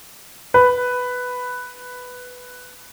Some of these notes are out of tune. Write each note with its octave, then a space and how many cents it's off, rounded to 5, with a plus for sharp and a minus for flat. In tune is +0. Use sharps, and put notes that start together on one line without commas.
B4 +5